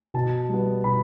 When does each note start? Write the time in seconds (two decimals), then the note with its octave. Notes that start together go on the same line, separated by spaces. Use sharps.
0.14 B2 A5
0.49 G3 B3
0.84 B2 B5